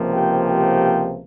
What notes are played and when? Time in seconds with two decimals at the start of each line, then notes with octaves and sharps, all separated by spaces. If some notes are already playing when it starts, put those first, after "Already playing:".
Already playing: C#2 C3 F3 A#3
0.12 G4 G5
0.45 G4 G5